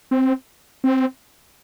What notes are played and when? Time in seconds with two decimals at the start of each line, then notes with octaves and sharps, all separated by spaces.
0.11 C4
0.84 C4